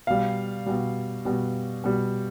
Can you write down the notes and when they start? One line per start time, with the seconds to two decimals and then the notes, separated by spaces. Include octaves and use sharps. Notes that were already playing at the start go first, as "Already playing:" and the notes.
0.07 B2 G3 F5
0.66 B2 G3
1.25 B2 G3
1.84 B2 G3